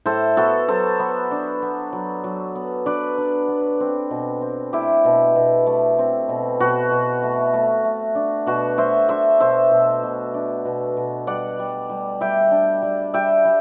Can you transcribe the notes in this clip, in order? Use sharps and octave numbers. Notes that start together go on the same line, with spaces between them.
A2 A4 C5
B3 F#4 A4
F#3 A4 C5
B3
D4
B3
F#3
F#3
B3
D4 B4 D5
D4
B3
C4
B2
C4
A3 E4 G4
B2
B2
A3
C4
B2
B2 F#4
B2
A3
A3
A3
D4
B2 F#4
A3 C5 E5
D4 C5 E5
B2 C5 E5
B2
B2
D4
B2
B2
G3 D5 F#5
G3
G3
G3 E5 G5
D4
G3
G3 E5 G5
G3